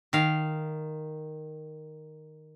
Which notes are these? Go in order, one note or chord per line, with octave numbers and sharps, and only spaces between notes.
D#3 F5